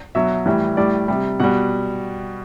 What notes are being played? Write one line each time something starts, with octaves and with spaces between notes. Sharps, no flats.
B2 F#3 E5
A2 E3 G3
A2 G3 D5
C3 G3
B2 G3 F#5